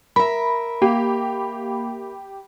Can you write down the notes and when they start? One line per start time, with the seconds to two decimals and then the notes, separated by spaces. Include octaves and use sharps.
0.16 A#4 E5 B5
0.82 A#3 G4